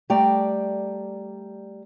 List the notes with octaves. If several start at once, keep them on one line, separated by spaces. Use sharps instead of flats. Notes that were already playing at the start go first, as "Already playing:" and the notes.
G3 A3 D5 G5 A#5